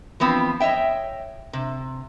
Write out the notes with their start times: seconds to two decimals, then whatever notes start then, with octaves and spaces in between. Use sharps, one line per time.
0.20 E3 F3 B3 C4
0.60 C#5 D#5 E5 G5
1.53 C3